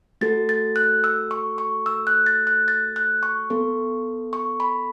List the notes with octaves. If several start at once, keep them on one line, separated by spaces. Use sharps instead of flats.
A3 F#4 A4 A6
A6
F#6
E6
C#6
C#6
E6
F#6
A6
F#6
A6
F#6
C#6
B3 A4
C#6
B5